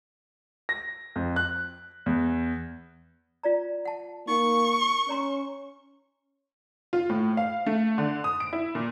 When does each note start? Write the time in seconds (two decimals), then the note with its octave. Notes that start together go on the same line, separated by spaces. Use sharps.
0.69 A#6
1.16 F2
1.36 F#6
2.06 E2
3.43 F4 D5 A#5
3.85 F#5 A5
4.28 A#3 D#4 F#5 C#6
5.09 C#4 C#5 A#5 C6
6.93 F4
7.09 A2
7.37 F5
7.66 A3
7.98 D3
8.24 D#6
8.40 D7
8.53 E4
8.75 A#2